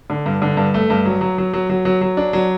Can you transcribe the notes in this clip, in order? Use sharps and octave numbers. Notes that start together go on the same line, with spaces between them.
D3
G2
D3
G2
A3
G2
F#3
F#3
F#3
F#3
F#3
F#3
F#3
D4
F#3